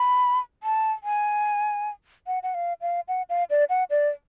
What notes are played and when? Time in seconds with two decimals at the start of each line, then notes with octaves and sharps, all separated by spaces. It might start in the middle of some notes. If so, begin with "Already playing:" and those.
Already playing: B5
0.63 A5
1.03 G#5
2.27 F#5
2.43 F#5
2.54 F5
2.81 F5
3.08 F#5
3.29 F5
3.50 D5
3.70 F#5
3.90 D5